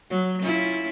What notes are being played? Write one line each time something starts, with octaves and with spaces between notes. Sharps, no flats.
F#3
C#4 E4 F4